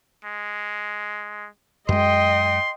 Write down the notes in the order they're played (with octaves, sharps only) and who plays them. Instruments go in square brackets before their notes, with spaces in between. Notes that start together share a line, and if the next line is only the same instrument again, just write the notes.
[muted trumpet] G#3
[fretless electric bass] F#2 G#3 [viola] D#5 G5 [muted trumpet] C6